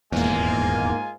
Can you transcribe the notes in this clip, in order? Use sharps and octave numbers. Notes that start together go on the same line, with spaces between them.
D#1 E2 G#2 G#3 A#3 F4 G#5